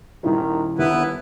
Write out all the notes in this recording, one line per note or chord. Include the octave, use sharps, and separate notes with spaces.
D#1 D#3 D#4 E4
G1 D#2 B3 E4 B4